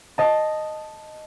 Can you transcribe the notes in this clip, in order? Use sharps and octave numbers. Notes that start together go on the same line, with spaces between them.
D#5 A5